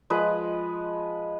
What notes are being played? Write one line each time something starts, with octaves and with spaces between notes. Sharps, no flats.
F3 G#3 B4 D#5